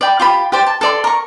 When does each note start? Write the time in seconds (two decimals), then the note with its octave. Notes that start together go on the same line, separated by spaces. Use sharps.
0.01 D5 G5 B5
0.20 F4 G4 B5
0.52 G4 C5 D5
0.66 A5
0.81 A4 D5 C6
1.04 A#4 C#6